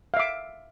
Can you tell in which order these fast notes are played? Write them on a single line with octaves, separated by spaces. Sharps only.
F5 E5 D6